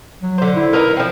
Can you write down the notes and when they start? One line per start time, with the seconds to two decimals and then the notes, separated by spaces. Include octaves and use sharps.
0.22 F#3
0.38 D3 C5
0.56 E4
0.73 B3 D#4 A#4
0.97 F3 C4